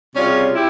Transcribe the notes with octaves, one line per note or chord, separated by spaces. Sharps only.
C3 G3 C#4 F4 G#4
E4 G4